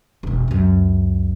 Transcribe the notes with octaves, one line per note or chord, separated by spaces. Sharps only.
E1 D4
C#2 F#2